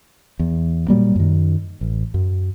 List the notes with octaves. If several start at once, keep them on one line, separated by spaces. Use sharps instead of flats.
E2
A#2 F#3 G3 A#3
F#2 D#3
A1
F#2